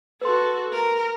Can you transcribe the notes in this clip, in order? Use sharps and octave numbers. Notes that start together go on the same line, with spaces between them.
F#4 A4 B4 C6
A#4